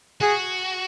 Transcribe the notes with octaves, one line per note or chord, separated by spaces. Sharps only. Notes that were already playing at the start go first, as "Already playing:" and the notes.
F#4 G#4